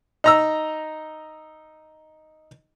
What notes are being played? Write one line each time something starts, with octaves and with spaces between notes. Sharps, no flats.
D#4 A#5 E6